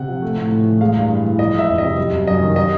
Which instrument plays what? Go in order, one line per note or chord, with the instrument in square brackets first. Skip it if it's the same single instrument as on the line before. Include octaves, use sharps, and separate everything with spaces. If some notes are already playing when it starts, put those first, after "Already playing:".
Already playing: [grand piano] C3 F#5
F3
A3
A2
A2
E3
G#3 F5
G2
G2
E3
F3 D#5
G#3 E5
F2
C3 D#5
G3
F#2
F#2 D#5
D#3
G3 D#5